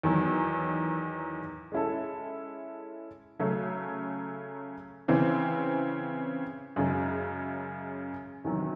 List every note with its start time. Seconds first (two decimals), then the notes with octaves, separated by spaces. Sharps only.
0.03 E2 D#3 F#3
1.72 G#3 C#4 E4 A4
3.40 C#3 F#3 A3 C#4
5.08 C#3 E3 C4
6.76 F#2 C#3 G#3
8.44 E2 C3 D#3 F#3